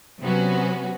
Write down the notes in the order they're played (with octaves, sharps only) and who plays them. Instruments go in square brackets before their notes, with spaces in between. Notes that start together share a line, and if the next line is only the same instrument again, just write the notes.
[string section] C3 F#3 B3 C#4 F#4